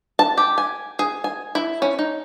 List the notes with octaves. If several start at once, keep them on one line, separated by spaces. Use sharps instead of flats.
A5
G4
G#5
G#4
G#5
E4
C#4
D#4